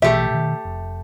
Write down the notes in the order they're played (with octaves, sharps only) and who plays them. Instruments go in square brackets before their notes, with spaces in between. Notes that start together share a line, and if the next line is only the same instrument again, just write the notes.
[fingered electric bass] A#1 B2 E3 [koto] A3 G4 [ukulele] E5
[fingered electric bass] B2 D#3
F1